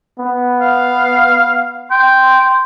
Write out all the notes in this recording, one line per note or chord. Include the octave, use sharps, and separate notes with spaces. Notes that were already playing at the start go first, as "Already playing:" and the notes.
B3
F5
G5 C6